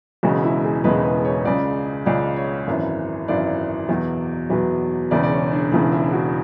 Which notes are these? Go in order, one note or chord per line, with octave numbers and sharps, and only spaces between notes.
E1 E2 C#3 G#3 F#4
E4
G#4
E1 E2 C#3 G#3 B4
B4
C#5
C#2 C#3 G#3 D5
C#2 C#3 G#3 D5
C#5
G#1 F#2 E3
G#1 F#2 E3 D5
E2 B2 F#3
E2 B2 F#3 B4
E1 E2 C#3 D5
D5
C#5
D4
E1 E2 C#3 E4
E4
F#4